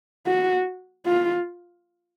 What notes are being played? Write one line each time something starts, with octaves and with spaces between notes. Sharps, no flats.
F#4
F4